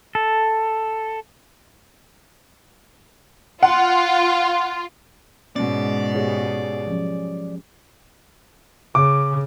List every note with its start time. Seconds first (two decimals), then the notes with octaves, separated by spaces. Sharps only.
0.15 A4
3.63 F4 F#5
5.56 G#2 B2 G#3 C#4 D5
6.15 G4 G#4 C#5
6.87 F3 F#3 C#4
8.95 C#3 D6